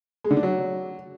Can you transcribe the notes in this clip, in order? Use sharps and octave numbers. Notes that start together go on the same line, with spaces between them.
G#3
D3
D4
F#3